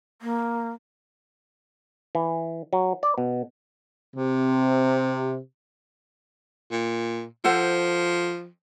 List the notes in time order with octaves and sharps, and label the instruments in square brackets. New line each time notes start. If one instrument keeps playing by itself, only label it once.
[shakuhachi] A#3
[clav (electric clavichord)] E3
F#3
D5
B2
[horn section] C3
[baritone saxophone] A#2
[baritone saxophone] F3 [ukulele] A4 C5 F#5